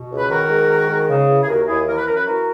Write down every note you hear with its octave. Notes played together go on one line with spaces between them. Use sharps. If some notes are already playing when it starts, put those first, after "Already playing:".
Already playing: B2
C#2
B4
D#3 F#4 A#4
G#2
D#3
G#2
C#3
E3
G#4
D#2 F#4 A#4
D#2 E4 G#4
E3 A#4
B4
F#2 A#4
B4
E3 F#4 A#4